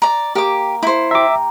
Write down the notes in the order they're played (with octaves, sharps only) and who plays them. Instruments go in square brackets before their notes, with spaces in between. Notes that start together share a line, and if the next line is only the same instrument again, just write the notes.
[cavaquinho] D5 A#5
[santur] A#3 F5 [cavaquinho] G4 D6
[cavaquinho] E4 C5
[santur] G4 A#5 [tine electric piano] E5 D6